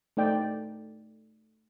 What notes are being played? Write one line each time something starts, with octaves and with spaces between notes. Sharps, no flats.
A3 D#4 D5 G5